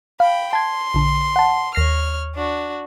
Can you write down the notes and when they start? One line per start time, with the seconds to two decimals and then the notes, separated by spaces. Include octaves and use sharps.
0.20 F5 G5 B5
0.53 A5 C6 G#6
0.94 A#1 D3
1.36 F#5 A5
1.75 D#2 C#5 F6 A#6 C7
2.35 D4 F#4